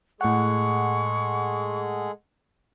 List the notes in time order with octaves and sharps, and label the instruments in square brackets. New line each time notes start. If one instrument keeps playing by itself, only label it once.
[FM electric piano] A2 F#5 [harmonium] G#3 G#4 A4 [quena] C#6